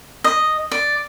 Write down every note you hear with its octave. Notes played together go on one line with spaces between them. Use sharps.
D#5
D5